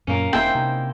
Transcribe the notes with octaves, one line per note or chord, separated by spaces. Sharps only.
F#2 A#2 A#3 C#4
E1 C4 D#4 E4 C5 E5 G5
C3 D#4